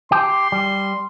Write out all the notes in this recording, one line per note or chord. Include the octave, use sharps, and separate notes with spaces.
G4 C6
G3